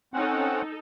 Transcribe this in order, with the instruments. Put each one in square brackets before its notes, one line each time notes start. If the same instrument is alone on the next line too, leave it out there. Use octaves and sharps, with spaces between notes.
[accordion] C4 C#4 F#5 [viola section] D#4 A4